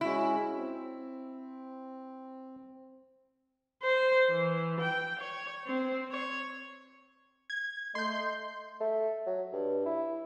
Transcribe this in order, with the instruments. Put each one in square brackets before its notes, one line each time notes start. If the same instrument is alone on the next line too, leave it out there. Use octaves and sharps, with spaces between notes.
[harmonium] G#3 C#4 F#4 [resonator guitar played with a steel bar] E4
[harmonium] C4
[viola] C5
E3
G5
C#5
C4
C#5
[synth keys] G#6
[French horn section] A3 D#5 [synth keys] C6 G6
[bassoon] A3
F#3
G2
E4